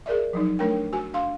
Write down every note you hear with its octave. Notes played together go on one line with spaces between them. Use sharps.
G#4 A#4 D5 E5
F3 F#3 D#4
A3 D4 A#4 C#5 G5
F#4 G#5
D4 F5 C6